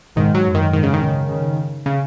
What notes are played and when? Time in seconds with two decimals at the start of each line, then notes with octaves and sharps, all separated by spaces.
0.16 G#2 D#3
0.34 F#3
0.45 F#2
0.55 D#3
0.73 G#2 D#3
0.83 C#3
0.94 D#3
1.01 C#3
1.29 C#3
1.86 C#3